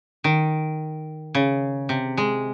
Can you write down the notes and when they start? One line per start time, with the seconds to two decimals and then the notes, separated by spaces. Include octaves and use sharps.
0.24 D#3
1.35 C#3
1.89 C3
2.18 G#3